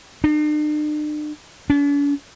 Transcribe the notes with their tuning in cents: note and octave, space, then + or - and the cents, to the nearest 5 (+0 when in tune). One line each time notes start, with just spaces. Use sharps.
D4 +45
D4 -45